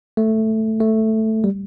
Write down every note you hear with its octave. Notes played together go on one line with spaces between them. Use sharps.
A3
A3
G3